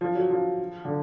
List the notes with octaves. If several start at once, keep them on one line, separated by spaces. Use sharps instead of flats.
F3
F#3
F3
D3